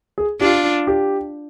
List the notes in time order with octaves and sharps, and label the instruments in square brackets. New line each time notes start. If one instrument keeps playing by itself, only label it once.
[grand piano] G#4
[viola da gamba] D4 F4 [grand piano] G4
[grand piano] G4